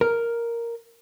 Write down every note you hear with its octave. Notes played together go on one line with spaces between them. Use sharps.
A#4